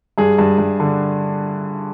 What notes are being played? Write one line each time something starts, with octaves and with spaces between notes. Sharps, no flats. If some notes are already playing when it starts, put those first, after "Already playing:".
G2 G#4
G2
G2
D3